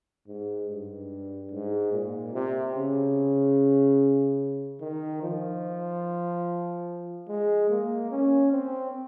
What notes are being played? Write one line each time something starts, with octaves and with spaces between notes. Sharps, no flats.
G#2
G2
G#2
A#2
C3
C#3
D#3
F3
G#3
A#3
C#4
C4